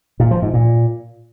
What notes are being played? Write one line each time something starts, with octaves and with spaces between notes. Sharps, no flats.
A#2
F3
G#2
A#2